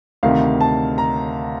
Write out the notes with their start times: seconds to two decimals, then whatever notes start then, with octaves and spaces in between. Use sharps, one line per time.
0.23 D2 C3 D#3 F5
0.61 A5
0.98 A#5